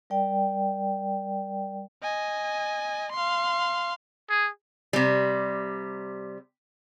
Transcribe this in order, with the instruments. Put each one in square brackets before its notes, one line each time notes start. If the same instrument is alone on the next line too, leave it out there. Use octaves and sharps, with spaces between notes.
[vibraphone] G3 A#4 D5 G5
[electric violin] D#5 G#5
F5 C6
[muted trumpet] G#4
[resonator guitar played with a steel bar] C3 G3